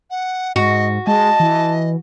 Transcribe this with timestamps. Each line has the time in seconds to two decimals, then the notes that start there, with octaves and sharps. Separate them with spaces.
0.11 F#5
0.56 G#2 F#4 D#5
1.07 G#3 D#5 A5
1.40 E3